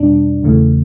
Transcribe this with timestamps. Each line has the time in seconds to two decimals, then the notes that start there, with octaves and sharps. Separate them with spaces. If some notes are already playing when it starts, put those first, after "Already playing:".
Already playing: E2 B2 G3 D4
0.43 E2 C#3 E3 A3